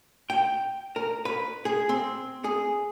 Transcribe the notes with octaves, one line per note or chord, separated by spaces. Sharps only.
G5
A#4
B4
G#4
C4
G#4